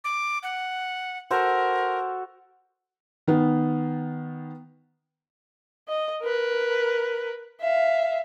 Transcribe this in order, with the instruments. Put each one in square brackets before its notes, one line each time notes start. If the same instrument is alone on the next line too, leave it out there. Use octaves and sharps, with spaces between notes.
[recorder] D6
F#5
[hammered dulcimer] F#4 A4 C5 [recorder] A#4
[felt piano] D#3 B3
[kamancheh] D#5
A#4 B4
E5 F5